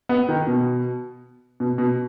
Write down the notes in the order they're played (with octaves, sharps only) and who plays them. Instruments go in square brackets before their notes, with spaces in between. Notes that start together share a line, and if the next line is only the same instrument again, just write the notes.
[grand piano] B3
D#3
B2
B2
B2